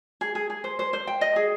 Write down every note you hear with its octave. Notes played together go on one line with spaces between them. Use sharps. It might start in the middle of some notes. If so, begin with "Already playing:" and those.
G#4
G#4
G#4
C5
C5
C5
G5
D#5
G#4